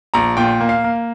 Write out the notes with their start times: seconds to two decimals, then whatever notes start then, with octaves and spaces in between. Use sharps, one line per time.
0.14 A#1 A#5
0.37 A#2 G5
0.60 A#3
0.69 F5
0.84 A#3